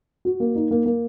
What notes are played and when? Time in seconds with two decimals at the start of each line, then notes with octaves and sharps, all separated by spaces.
0.25 F#4
0.40 A#3
0.55 D#4
0.71 A#3
0.86 A#3